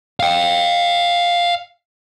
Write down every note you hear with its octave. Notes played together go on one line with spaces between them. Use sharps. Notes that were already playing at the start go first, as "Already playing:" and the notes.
F5 G5